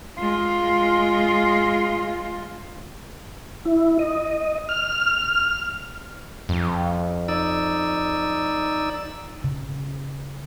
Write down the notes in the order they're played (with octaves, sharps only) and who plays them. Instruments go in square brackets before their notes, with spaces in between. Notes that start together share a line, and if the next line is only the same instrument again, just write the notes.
[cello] G#3 F4
[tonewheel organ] E4
D#5
F6
[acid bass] F2
[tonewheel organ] D#4 D5 E6
[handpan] C#3